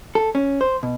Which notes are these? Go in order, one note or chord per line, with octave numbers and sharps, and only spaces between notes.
A4
C#4
C5
B2